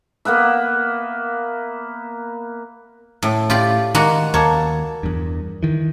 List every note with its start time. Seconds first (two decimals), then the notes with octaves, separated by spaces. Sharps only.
0.25 A#3 B3 B4 E5
3.22 A2
3.50 A2 F4 G4 D5
3.95 D#3 G#3 A#3 F#4
4.34 D#2 A#3 C#5 A5
5.03 E2 G2
5.63 D#3 E3